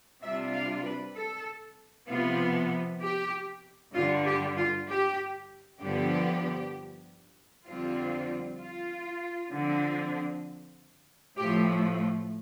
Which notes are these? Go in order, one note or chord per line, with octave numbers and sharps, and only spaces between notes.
C3 G3 D4 F4 E5
F5
B4
A4
C3 F3 B3 F4
G4
G2 D3 G3 F4
G4
F4
G4
G2 D3 F3 B3 G4
F2 D3 G3 C4 F4
F4
D3 F3 C4
A2 F3 A3 G4